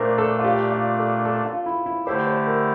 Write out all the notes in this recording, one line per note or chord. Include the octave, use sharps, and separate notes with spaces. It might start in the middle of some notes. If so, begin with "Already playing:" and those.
Already playing: A#2 A3 D4 A#4 C5
A4
F4
G4
F4
A4
A4
F4
E4
E4
D3 A3 E4 G4 C5
C5
A#4